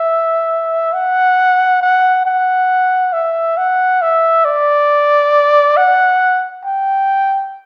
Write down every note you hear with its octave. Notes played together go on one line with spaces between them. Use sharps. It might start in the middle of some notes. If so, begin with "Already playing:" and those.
Already playing: E5
F#5
F#5
F#5
E5
F#5
E5
D5
F#5
G5